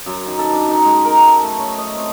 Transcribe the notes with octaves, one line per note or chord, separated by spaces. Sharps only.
F#2
D#3
A4
D4
D#4
G#3
A#4
A4
A3
C#4
D#5
C4